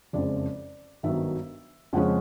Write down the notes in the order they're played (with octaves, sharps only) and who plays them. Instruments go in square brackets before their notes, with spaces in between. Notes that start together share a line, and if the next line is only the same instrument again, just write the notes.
[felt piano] F#1 F2 C#3 F3 G#3 D5
G#1 G2 D#3 F#3 B3 E5
F2 C#3 F3 G#3 C#4 F#5